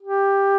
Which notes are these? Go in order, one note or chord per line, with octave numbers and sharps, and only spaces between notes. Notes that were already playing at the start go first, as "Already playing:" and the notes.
G4